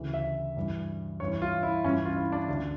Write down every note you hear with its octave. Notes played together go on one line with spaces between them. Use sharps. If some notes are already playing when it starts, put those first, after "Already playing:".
Already playing: D2 C#3 E3
E5
G2 E3
G2 E3 C#5
F4
E4
G2 E3 C#4
F4
E4
D4
D2 D3 D4